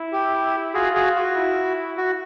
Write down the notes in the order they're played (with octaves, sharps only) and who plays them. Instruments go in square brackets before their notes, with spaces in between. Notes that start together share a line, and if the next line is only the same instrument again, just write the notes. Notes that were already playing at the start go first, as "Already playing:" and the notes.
Already playing: [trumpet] E4
[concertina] G4
[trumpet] F4 [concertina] F#4 G#4
[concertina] F#4 G#4
F#4
[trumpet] E4
[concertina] F#4